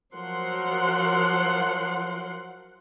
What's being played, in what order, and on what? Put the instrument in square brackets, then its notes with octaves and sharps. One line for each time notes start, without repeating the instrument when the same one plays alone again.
[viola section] F3 F#3 A#4 F#5 C6